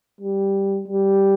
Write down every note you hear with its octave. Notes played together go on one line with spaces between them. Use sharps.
G3
G3